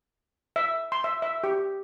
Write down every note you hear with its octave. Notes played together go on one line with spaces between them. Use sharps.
E5
C6
E5
E5
G4